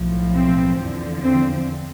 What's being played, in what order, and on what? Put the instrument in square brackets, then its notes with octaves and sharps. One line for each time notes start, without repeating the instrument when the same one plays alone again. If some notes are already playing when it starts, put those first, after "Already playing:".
Already playing: [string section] B1 A2 F3
C4
E2 D3 F3
C4